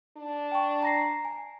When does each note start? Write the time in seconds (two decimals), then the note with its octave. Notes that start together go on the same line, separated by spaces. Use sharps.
0.17 D4
0.51 G5 C#6
0.82 A#5 A#6 C7
1.25 G#5